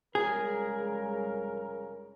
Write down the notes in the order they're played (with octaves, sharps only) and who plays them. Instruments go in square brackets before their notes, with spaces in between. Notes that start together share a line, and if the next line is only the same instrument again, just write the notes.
[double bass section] F1 G3 G#3 [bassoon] C#3 [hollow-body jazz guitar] G#4 [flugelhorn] A#4